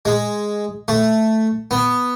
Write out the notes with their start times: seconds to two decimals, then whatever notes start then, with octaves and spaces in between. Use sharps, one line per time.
0.05 G#3
0.88 A3
1.71 B3